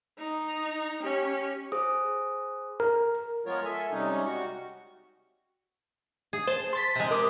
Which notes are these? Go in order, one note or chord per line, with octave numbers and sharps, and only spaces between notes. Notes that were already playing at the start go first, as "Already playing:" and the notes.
D#4
C#4 G4
G#4 C5 D#6
A#4
F3 G#3 B3 F4 A#4 C#5
A4 E5 G#5
C3 G3 G#3 C#4 D#4
G3 F#4 C#6
G#4
C5 A5
C6 A6 B6
C3 G#3
A#4 D6 D#6